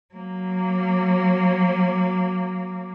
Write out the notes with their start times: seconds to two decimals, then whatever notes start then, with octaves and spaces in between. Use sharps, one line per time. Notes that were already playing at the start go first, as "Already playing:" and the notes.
0.14 F#3 A#3